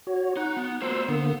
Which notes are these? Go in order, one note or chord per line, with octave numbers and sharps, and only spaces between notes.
F#4 C#5
D#4 F#5
B3
A#3 F4 F#4 C5 C6 E6
D3 A#3 B3